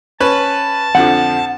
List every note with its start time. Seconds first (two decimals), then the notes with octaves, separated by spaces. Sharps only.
0.20 C#4 B4 A5
0.95 F2 D3 F3 F#5